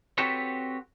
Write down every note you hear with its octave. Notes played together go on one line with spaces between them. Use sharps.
C4 F#4 G4 A4 B4 C#5